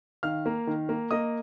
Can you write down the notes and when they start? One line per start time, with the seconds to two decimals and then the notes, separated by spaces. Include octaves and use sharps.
0.23 D#3 F5 F6
0.46 A#3
0.67 D#3
0.89 A#3
1.11 A#3 D#5 D#6